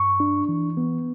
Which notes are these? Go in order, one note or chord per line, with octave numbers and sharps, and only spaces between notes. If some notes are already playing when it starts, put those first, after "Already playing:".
Already playing: G2 C#6
D4
E3
B3